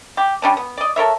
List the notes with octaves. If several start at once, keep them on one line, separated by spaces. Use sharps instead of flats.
G4
G3 C#4 D4
B3
D5 D#5
A4 A#4 C#5 E5